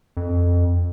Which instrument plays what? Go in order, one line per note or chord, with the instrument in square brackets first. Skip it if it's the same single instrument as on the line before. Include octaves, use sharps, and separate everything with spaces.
[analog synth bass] F2